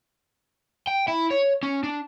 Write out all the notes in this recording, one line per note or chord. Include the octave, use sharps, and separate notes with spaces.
G5
E4
C#5
C#4
D4